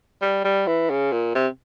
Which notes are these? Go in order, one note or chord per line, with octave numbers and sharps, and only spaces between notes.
G3
G3
E3
C#3
A#2
C3